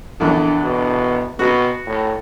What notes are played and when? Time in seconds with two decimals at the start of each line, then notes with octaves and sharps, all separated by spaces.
0.20 A#1 E2 D3
0.63 B2
1.39 B2 F#4
1.86 A2